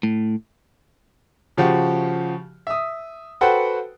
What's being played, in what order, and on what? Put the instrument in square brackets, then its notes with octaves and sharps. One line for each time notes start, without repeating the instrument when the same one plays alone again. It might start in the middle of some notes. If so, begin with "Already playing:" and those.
[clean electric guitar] A2
[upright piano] C#3 F3 F#4 G4
E5 D#6
F#4 A4 B4 C5 F#5 G5